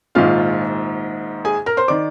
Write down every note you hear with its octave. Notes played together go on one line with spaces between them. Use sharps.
A#1 G#2 D#3 F4 F5
G#4 G#5
A#4 A#5
C5 C6
D#3 D5 D6